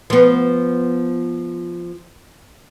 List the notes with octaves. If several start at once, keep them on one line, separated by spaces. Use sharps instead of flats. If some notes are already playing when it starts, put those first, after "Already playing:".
F3 B3